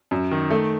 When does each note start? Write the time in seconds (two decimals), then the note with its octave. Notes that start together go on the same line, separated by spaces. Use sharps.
0.11 F#2
0.31 D#3
0.51 A3